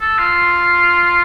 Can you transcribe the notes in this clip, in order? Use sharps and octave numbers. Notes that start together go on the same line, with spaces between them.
A4
F4